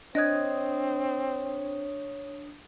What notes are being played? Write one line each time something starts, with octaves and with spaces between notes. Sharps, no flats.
C4 D4 C#5 D#5 D#6 F#6 G#6